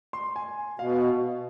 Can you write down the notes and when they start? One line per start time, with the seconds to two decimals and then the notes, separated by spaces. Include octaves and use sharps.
0.13 C6
0.36 G#5
0.79 B2 F5